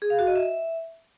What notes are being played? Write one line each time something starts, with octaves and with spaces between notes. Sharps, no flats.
G#4
F5
F#4
D#5
E5